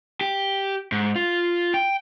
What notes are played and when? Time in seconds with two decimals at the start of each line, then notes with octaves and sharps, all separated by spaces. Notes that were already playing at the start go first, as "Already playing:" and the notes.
0.21 G4
0.92 G#2
1.16 F4
1.74 G5